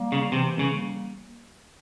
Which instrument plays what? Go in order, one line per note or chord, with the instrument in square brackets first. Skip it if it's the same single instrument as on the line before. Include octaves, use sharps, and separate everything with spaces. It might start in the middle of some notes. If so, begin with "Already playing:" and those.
Already playing: [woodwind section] G3 A#3
[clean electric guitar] C#3
[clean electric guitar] C3 [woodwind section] E3
[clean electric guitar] C#3
[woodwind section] G3 A#3